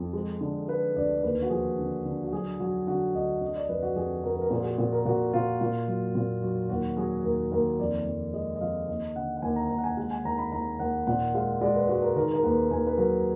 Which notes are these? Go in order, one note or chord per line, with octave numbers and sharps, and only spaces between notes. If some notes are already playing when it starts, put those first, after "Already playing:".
Already playing: F2
G#3
D3
G#3 B4
D2 D5
D#2 B4
F#4
F3 G#4
D3
D3
F#4
F#3 G#4
F#3 F#4
D3 F#4
D2 D#5
D3 D#5
D5
F2 B4
F#4
F2 G#4
F2 A#4
B4
A#4
A#2 G#4
F#4
G#4
A#2
A#4
A#2 F#4
A#2 F4
A#2
F#3
A#2
F#3
D#2 F#4
F#3 G#4
D#2 A#4
D#2 A#4
F2 D5
F2
G#3 D#5
D#5
F2 F5
D#2 D#5
D3 F#5
F#5
D#2 G#5
A#5
D#2 A#5
F#5
G#5
G#3 F#5
G#5
D#2 A#5
B5
D#2 A#5
D#2 F#5
A#2 F#5
G#3 F5
G#3 D5
B4
G#3 F#4
A#4
D#3 A#4
A#4
D#2 B4
D#2 G#5
B4
F#3 A#4